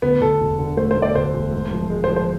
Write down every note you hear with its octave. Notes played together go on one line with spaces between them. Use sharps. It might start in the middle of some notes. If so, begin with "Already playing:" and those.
D2 B3
D2 A4
E1
D3
A3 C5
C5
A3
D5
D2 C5
E1
G#2
F3
G#3
C5
F3
C5